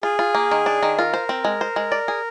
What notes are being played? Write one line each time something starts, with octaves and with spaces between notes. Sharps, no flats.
F4 G#4
F4
A#3
D#3
D4
D#3
F4 A#4
C5
C4
G#3
C5
G#3
D5
G#4